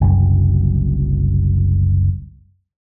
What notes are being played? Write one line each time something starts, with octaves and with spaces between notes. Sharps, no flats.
F#1 C2 F#2